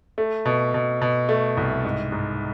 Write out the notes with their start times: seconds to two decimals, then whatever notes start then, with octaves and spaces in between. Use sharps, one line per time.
0.18 A3
0.45 B2
0.74 B2
1.02 B2
1.29 A3
1.57 C2
1.84 G#2
2.12 G#2